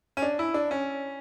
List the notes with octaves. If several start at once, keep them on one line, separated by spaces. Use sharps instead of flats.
C#4
D4
E4
D4
C#4